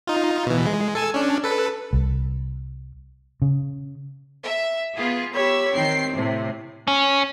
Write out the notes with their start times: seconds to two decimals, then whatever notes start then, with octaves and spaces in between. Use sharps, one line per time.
0.07 D#4 F4
0.47 B2 E3
0.66 G#3
0.95 A4 G#5 E6
1.14 C#4 D4
1.44 A4 B4
1.93 C2
3.42 C#3
4.44 E5
4.95 B3 F4 G#4
5.33 G4 C#5 B5 E6
5.73 D#3 C4 G5 C7
6.13 A2 C3
6.88 C#4